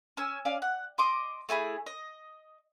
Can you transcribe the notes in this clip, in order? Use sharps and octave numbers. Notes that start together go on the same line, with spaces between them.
C#4 G#5 E6
C#4 D5 F5
F#5
D#5 C6 D6 D#6
A3 E4 G#4 B5
D#5